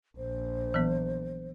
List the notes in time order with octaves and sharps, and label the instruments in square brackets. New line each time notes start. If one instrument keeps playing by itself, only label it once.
[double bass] A#1 [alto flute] C5
[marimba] E3 F#3 B3